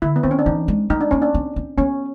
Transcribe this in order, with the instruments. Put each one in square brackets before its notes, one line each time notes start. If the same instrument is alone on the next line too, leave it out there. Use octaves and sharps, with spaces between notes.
[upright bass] D3 [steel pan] E4
[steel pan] B3
[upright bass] D#3 [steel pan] C4
[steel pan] C#4
D4
[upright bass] E3 [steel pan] D#4
[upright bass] G#3
[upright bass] A3 [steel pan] D#4
[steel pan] D4
[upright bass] A#3 [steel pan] C#4
[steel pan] D4
[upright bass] C4
C4
[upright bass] B3 [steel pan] C#4